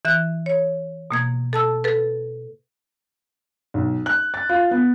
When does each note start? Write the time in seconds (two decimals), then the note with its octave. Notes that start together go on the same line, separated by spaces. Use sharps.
0.05 E3 E5 F#6
0.46 C#5
1.11 B2 A#3 G#6
1.53 A4 A5 E6
1.84 A4 B4
3.74 B1
4.06 F#6
4.34 A6
4.49 F4
4.71 B3